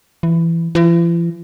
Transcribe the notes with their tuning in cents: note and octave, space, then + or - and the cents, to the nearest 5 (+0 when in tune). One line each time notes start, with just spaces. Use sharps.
E3 +15
E3 +45